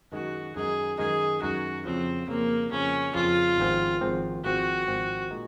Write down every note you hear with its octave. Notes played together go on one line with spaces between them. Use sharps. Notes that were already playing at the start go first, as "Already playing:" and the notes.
F#2 D#3 G#3 D#4 F#4
F#2 D#3 G#3 D#4 G#4
F#2 D#3 G#3 D#4 G#4
F#2 D#3 G#3 D#4 F#4
F2 C#3 F3 C4
F2 C#3 F3 A#3
F2 C#3 F3 C#4
F2 C#3 F3 F4
G#1 G#2 F3 C4
G#1 G#2 F3 C4
G#1 G#2 F3 C4 F#4
G#1 G#2 F3 C4
A#2 G#3 D#4